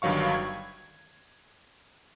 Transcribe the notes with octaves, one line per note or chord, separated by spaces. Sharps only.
G1 G2 D#3 F#3 F5 C#6
G#6